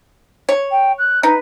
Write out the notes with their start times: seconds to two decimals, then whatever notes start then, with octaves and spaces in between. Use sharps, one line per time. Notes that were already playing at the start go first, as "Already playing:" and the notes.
0.49 C#5
0.71 G5
0.98 F#6
1.23 D#4 B4